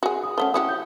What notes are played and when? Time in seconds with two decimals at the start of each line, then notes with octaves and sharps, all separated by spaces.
0.03 F#4 G#4
0.24 D#6
0.38 F3 A3 C#4 F#5 A5 G7
0.54 E4 F#4 G4 D#6
0.69 G6